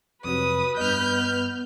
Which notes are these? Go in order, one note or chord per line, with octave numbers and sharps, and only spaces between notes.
F2 C3 F#3 B4 D#6
G2 B3 D#5 F6 G6